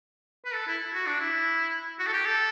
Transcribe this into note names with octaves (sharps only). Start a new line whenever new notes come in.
B4
A4
E4
F#4
D4
E4
F#4
A4
G4
A4